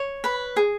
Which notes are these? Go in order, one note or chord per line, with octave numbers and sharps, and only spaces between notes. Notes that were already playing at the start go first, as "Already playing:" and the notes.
Already playing: C#5
B4 B5
G#4